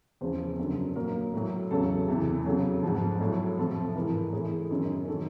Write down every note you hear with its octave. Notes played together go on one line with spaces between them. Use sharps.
E2 C#3 F3 C5
F#2 D3 F#3
A#2 F#3 A#4
A2 F#3
E2 C#3 F#3 A4
E2 C3 E3
F2 C#3 F#3 A4
G#2 F3
A2 F#3
F2 C3 F3 A4
G#2 E3 A#4
A2 E3 G#4
F#2 D#3 F#3
D#3 F#3 A4